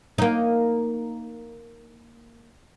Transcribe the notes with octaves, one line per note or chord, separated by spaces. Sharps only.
A#3 D#4